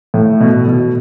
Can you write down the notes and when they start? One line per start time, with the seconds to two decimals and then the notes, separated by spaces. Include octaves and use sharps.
0.14 A2
0.40 B2
0.67 B2